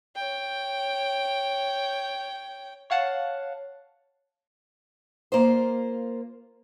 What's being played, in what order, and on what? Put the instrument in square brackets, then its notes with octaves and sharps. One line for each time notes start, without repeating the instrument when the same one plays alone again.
[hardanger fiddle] C#5 G5
[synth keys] C#5 F5 F#5 A5
[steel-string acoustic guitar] A#3 F4 C5